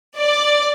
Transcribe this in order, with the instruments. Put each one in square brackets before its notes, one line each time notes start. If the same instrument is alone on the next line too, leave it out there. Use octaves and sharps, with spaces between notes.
[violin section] D5